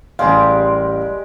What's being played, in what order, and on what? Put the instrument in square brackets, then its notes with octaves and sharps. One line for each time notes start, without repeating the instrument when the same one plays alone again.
[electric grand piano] A1 F5 [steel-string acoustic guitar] G3 D5 [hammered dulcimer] G#3 G4 A#4